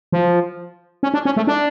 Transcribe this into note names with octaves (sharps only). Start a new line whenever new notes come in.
F3
C#4
D4
C#4
A3
D4